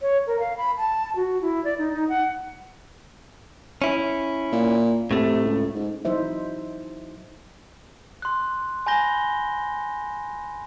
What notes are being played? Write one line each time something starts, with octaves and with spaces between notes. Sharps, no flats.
C#5
A#4
F5
B5
A5
F#4
E4
D5
D#4
D#4
F#5
C#4 E4
A#2
A2 C3 A3
C#2
G#2
F#3 D#4 E4 C5 E5
C6 F#6
G#5 B5 G6 A#6 G7